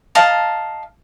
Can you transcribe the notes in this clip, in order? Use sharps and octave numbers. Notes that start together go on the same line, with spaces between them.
D#5 F5 A5 A#5